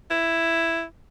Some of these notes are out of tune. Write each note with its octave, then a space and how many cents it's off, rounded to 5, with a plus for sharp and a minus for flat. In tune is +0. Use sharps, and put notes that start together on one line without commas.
E4 +5